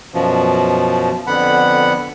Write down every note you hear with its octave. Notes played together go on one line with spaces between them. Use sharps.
F#2 B2 F3
F2 D3 B3 F#5 B5